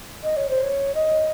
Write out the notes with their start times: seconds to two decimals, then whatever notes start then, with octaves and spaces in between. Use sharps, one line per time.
0.23 D#5
0.37 C#5
0.49 C5
0.62 C#5
0.95 D#5